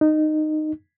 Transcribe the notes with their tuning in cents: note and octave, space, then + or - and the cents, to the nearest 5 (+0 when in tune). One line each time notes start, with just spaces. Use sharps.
D#4 -15